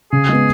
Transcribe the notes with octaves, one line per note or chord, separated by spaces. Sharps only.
C#3 G#4
G#3 B3